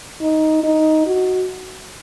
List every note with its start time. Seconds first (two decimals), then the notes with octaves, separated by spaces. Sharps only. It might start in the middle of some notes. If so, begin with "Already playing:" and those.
0.21 D#4
0.63 D#4
1.07 F#4